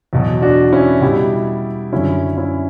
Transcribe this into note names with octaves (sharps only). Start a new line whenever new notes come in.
E2 B2 F#3
D4 F#4
C#4 E4
B2 G3 E4 G4
F#2 D3 F#3 C#4 E4
C#4 E4